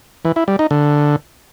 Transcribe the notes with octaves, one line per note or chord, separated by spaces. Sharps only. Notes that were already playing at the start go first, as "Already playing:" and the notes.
E3
E4
G3
D#4
D3